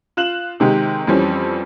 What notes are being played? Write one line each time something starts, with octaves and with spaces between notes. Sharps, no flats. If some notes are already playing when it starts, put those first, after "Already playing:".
F4 F#6 E7 F#7
C3 D#3 G#3 G4
F2 E3 G3 C4 C#4